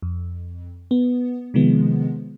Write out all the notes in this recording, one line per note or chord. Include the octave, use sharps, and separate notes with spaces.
F2
B3
C3 D#3 F3 G#3 B3